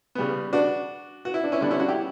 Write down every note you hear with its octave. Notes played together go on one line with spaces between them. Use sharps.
C#3 G3 B3
D4 F#4
F#4
E4
D4
C#4 E4
D3 G3 B3 D4
C#4 E4
D4 F#4
E4 G4